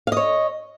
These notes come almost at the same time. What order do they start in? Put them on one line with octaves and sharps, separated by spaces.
F5 D#5 C#5